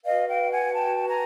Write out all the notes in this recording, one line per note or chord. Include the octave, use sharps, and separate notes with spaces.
F#4 B4 D#5 F5
F5 G5
F#5 G#5
G5 A5
G#5 A#5